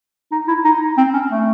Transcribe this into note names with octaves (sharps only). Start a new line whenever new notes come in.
D#4
E4
D#4
C4
C#4
A3